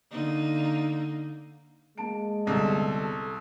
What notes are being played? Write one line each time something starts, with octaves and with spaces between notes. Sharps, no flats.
D3 A#3 D#4
G#3 A#3 A5 D7
G1 C2 B3 A4